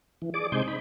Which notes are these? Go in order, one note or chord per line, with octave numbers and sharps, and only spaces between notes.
E3
G#4 D5 D6
C3 G#3 D#4 C5 G#5 G6
D#4 B5